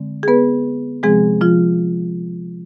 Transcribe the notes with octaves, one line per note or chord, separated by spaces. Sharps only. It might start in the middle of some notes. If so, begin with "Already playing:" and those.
Already playing: D3 G#3 C4
G#4
B3 B4
C3 F3 G#3 C4 G#4
F3 F4